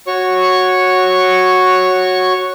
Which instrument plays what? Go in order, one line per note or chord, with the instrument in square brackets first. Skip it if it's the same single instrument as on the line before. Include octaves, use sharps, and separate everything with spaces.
[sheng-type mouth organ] F#4 C#5 C#6